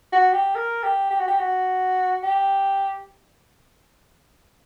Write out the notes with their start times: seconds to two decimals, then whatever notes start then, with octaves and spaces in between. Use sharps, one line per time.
0.13 F#4
0.34 G4
0.55 A#4
0.83 G4
1.11 G4
1.20 F#4
1.28 G4
1.39 F#4
2.23 G4